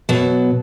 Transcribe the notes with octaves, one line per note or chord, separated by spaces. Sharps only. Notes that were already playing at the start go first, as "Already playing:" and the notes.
B2 F#3